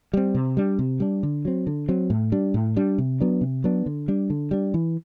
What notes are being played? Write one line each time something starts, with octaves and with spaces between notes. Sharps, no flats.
G3 C4
C3
G3 D4
C3
G3 D4
D3
F#3 C4
D3
F#3 C4
A2
G3 D4
A2
G3 D4
C3
F#3 B3 D4
C3
F#3 B3 D4
D3
G3 D4
D3
G3 D4
E3